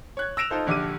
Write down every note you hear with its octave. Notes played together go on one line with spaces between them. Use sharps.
C#5 F#6 G#6
E6 A#6 D7 E7 F7
D#4 F4 A4 C5
A#1 D3 G4 D6 F6 D#7